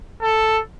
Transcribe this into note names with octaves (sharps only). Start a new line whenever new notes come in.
A4